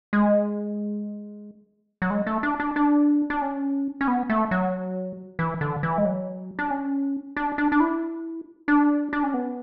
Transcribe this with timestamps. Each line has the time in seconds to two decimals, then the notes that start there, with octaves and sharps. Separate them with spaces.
0.13 G#3
2.02 F#3
2.10 G#3
2.27 A3
2.43 D4
2.60 D4
2.76 D4
3.30 D4
3.42 C#4
4.01 C#4
4.08 B3
4.30 A3
4.51 F#3
5.39 E3
5.61 D3
5.83 E3
5.98 G#3
6.05 F#3
6.59 D4
6.71 C#4
7.36 D4
7.58 D4
7.72 D4
7.80 E4
8.68 D4
9.13 D4
9.23 C#4
9.34 B3